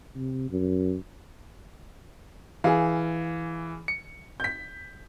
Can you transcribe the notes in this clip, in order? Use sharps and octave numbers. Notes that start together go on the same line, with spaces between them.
C3
F#2
E3 G#4 F5
C#7
G6 B6